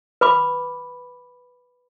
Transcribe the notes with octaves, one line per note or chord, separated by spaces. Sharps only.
B4 B5 D6